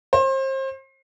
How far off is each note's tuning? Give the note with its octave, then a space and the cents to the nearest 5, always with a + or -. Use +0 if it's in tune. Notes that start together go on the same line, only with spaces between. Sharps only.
C5 +35